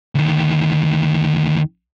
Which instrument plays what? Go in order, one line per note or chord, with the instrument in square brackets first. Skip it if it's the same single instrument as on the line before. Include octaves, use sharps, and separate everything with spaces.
[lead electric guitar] D2 D#3